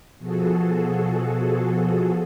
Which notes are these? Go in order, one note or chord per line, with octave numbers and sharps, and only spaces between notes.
B2 F3 F#4 G#4 A4